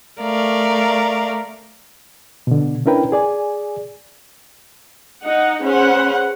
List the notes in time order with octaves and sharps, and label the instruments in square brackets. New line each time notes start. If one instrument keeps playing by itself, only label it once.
[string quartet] A3 A#4 D5 F5
[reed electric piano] B2 D3
C#4 D4 E4 A#4 B4 G5
G#4 D5 G#5
[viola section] D#4 D#5 F#5
C#4 G#4 B4 C5 F#5